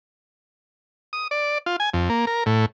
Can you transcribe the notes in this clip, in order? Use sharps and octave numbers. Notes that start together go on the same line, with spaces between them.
D#6
D5
F4
G#5
F2
A#3
A#4
A2